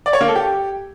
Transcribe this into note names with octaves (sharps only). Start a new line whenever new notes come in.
D5
C#5
A#3
A4
G4